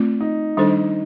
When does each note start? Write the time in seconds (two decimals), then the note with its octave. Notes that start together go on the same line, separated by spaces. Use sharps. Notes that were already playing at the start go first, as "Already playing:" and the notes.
Already playing: A3 C4 F4 D5
0.21 D#4
0.57 D#3 G3 D4 A4 C5